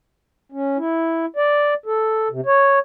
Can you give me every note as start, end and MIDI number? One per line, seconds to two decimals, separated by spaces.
0.52 0.77 61
0.78 1.26 64
1.36 1.74 74
1.86 2.28 69
2.31 2.41 48
2.46 2.79 73